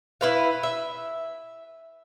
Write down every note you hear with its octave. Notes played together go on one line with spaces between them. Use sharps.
E4 B4 F5
E5